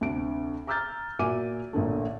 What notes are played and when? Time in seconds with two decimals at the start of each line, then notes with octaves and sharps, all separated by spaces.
0.01 D2 C3 D4 D7
0.67 A#5 D6 E6 F6 G6 A6
1.19 A#2 F#4 E5 G#5 D6 D#7
1.73 A1 A#2 D3 A3